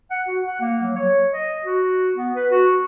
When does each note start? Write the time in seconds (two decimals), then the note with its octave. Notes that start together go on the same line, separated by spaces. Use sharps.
0.10 F#5
0.28 F#4
0.46 F#5
0.61 A#3
0.82 F#3
0.95 C#5
1.32 D#5
1.64 F#4
2.16 B3
2.35 B4
2.51 F#4